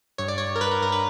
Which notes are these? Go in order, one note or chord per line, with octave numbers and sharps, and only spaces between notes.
G2 C#5
D5
G2 C#5
A#4
G2 B4
A#4
G2 A#4
B4